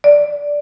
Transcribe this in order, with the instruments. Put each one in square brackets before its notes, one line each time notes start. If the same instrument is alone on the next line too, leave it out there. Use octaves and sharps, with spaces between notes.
[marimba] D5